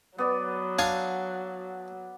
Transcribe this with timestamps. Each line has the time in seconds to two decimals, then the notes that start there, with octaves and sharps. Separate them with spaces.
0.18 F#3 B3 D5
0.79 D4 F5 G#5